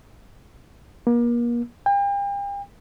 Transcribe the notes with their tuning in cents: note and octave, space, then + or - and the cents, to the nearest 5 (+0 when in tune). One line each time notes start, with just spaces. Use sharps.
A#3 +35
G5 +40